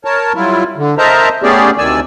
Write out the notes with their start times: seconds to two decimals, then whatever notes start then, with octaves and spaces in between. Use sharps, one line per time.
0.05 A#4 C#5 A5
0.35 F#3 G3 E4 F4
0.77 D3
0.98 A#4 C5 D#5 E5 A5 A#5
1.43 A3 B3 C#4 G4 G#4 D5
1.78 D2 C3 D#3 D5 G#5 E6